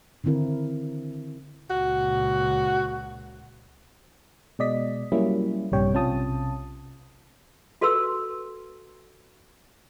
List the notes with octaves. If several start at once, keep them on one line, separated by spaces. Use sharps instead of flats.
D3 D#3 C4 E4 A#4
C#2 A#2 F#4
B2 G#3 D5 D#5 B6
F#3 G3 A#3 C#4 E4
A#1 G2 C3 G3 C#5 G5
B1 C3 C#4 F4 A5 D#6
F#4 A4 B4 C6 E6